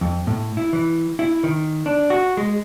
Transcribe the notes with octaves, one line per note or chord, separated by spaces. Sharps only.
F2
A2
E4
E3
E4
D#3
D4
F#4
G#3